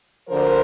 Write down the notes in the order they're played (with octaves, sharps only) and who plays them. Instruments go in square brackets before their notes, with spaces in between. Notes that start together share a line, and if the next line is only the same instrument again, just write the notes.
[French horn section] D2 D3 F3 A#4 C5